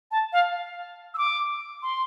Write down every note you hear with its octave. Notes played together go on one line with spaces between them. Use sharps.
A5
F5
E6
D6
C6